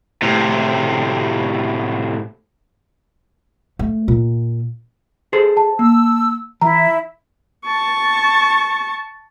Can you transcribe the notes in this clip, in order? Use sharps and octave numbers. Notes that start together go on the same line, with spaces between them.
A2 C3
A3
A#2
G#4 A4 C5
A5
A#3 E6
E3 E4 E5 A#5
A5 C#6